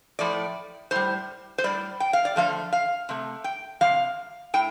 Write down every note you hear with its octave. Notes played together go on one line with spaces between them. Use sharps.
A2 F3 A3 D5
A2 G3 C5
C5
A2 G3 D5
G5
F5
D5
D3 F3 A3 F5
F5
C3 A3
G5
C3 G3 F5
A2 G5